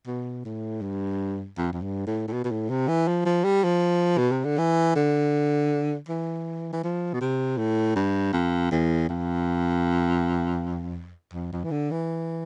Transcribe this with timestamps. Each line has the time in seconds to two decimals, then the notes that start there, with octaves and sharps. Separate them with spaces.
0.07 B2
0.45 A2
0.81 G2
1.58 F2
1.73 F2
1.82 G2
2.07 A2
2.28 A2
2.33 B2
2.44 B2
2.51 A2
2.70 C3
2.88 E3
3.08 F3
3.26 F3
3.44 G3
3.64 F3
4.18 B2
4.32 C3
4.45 D3
4.58 E3
4.96 D3
6.09 E3
6.73 E3
6.84 F3
7.13 B2
7.21 C3
7.58 A2
7.96 G2
8.33 F2
8.72 E2
9.09 F2
11.34 F2
11.53 F2
11.64 E3
11.71 D3
11.91 E3